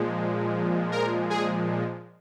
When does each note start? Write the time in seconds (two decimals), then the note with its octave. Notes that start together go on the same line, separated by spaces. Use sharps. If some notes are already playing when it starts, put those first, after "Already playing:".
Already playing: A#2 F3 G#3
0.92 A#4
1.30 G#4